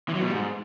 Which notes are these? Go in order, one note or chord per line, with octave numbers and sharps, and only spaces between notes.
E3
F#3
B2
G3
G#2